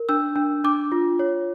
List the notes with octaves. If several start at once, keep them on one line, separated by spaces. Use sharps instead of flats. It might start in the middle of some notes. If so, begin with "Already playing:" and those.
Already playing: A#4
D4 E6
D4
D4 D6
F4
C#5